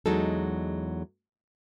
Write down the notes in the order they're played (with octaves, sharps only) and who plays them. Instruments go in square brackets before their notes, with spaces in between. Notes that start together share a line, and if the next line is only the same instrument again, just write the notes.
[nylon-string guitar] E2 F#3 G#3 D#4 A4